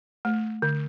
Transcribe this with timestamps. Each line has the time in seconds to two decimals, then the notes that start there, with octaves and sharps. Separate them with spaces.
0.25 A3
0.62 D3